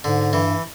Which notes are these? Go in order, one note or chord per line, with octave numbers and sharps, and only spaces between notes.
G#2 D3
G2 E3